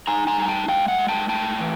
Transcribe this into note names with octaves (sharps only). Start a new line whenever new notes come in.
D#4 G#5 A#5
G#5 A#5
G3 G#5
G5 A5
G#3 F5 G5
E5 F#5
G#3
G5 A5
A2 G5 A5
E3